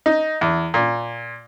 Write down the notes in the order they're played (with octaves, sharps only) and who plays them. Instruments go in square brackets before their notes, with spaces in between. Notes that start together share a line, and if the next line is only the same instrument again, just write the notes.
[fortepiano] D#4
E2
A#2